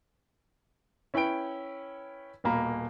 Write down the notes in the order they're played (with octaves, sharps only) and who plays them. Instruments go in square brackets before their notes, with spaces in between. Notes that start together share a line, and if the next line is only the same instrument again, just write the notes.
[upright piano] C#4 E4 B4 C#5 G5 D7
D#1 B2 A#3 A#5 B5